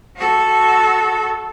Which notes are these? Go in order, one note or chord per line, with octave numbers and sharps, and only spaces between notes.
F#4 A4